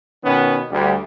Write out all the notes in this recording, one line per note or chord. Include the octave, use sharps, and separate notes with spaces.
B2 D#3 B3 C#4
D2 G3